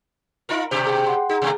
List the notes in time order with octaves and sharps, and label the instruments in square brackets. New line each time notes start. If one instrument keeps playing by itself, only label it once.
[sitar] D#4 F4 A#4
[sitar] G2 B2 G4 [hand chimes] C5
[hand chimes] G#4 G5
F#5 C6
[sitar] D#4 [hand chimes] G#4
[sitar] B2 F#3 A3